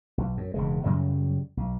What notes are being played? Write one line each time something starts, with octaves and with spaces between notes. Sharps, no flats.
B1
F#2
E1 C#3 G#3
F#2 C#3 F#3 G3
B1